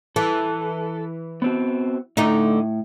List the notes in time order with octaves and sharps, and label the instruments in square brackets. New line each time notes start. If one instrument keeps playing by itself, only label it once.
[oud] E3 [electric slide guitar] A4
[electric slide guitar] B3 C4 F#4
[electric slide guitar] A2 [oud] D3 A3 D#4